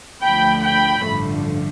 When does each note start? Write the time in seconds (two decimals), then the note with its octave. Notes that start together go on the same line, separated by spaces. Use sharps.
0.23 D2 D3 F3 A3 G5 B5
0.63 G5 B5
1.02 A1 G2 D3 F3 A3